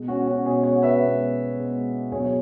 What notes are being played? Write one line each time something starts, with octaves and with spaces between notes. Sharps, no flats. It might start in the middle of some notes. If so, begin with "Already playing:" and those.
Already playing: B2 G#3
C#4 F#4
C#4 F#4
B2 G#3 G#4 C#5
C#5 F#5
B4 E5
B2 G#3
B2 G#3
E2 B2 F#3 G#4 C#5